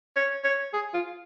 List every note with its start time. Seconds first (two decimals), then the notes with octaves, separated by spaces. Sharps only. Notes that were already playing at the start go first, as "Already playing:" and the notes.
0.16 C#5
0.44 C#5
0.73 G#4
0.94 F4